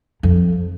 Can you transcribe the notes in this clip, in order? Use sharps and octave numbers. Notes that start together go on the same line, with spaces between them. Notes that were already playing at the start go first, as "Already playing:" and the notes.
F2